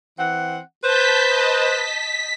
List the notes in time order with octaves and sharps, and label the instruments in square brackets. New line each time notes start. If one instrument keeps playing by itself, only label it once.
[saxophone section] E3 C4 F#5
[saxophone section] B4 C5 [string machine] A5 G6 B6
[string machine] D#5 A5
B6